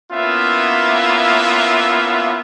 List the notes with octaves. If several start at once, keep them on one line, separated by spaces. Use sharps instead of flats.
A#3 B3 C#4 E4 F4 E5